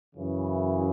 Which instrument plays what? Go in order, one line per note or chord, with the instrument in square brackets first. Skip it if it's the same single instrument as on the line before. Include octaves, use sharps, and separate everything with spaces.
[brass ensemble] F#2 C#3 E3